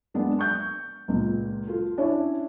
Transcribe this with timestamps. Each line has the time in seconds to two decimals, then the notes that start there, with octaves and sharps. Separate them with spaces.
0.14 G#3 A#3 B3 D4
0.39 C#6 G6
1.08 C#2 A#2
1.67 F4 A4
1.98 C#4 D4 E4 C#5 E5